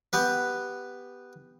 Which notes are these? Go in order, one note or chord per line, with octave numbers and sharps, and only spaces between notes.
B3 G4 B4